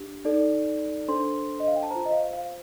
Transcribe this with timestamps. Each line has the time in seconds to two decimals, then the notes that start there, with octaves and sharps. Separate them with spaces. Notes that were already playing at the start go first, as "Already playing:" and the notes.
Already playing: D4 G4
0.25 D#4 A4 D5
1.08 D4 A4 C5 C6
1.60 D#5
1.68 F5
1.76 G5
1.83 A5
1.90 F4 C5 A#5
2.06 D#5
2.12 F5
2.33 F5